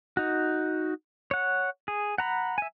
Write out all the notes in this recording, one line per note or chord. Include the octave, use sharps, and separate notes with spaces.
D#4 F#4
C#5 F#5
G#4
F#5 A#5 B5
E5 G#5